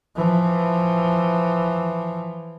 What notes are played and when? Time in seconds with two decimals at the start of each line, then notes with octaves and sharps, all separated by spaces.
0.16 E3 F3